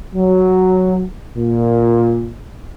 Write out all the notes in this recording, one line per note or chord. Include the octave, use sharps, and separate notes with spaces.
F#3
A#2